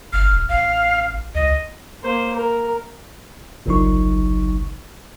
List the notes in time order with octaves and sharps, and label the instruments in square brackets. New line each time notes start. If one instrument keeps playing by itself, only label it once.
[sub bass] G1 [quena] F6
[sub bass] D#1
[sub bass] A1 [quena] F5
[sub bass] C#2 [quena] D#5
[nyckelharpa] A#3 C5
A#4
[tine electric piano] G1 C2 C#3 F#3 D#4 C#6